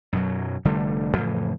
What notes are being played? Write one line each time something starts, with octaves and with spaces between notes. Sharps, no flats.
F#2 B2 F#3
F1 D3 G3 A3
F2 A2 C#3 E3